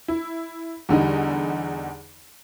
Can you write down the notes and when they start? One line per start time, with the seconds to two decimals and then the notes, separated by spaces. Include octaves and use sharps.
0.08 E4
0.89 E2 D3 G3 D#4